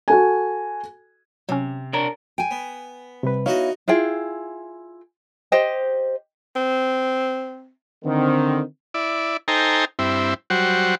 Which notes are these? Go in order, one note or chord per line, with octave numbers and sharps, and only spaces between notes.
F#4 A4 G#5
C3 F#3 C#4
D4 A#4 C#5 A#5
G5 G#5
B3
C3 G3 B4
B3 D#4 E4 F#4 C#5 D#5 F5
E4 F4 G#4 G5
G4 C5 D#5 G5
C4
D3 D#3 C4
E4 D5
D#4 A4 C5 G5 G#5 A#5
G2 C4 E4
F#3 G3 F#4 C5